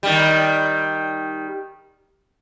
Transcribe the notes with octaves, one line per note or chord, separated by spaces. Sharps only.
D#3 G3